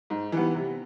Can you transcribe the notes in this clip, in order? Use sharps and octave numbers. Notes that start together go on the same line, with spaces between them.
G#2
E3 G3 B3
C3